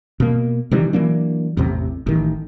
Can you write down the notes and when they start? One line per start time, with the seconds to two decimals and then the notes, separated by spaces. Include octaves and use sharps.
0.20 B2 A#3
0.71 C3 D#3 E3 G3
0.93 E3 F#3 A#3 D4
1.57 A1 E2 C3
2.07 A1 D#3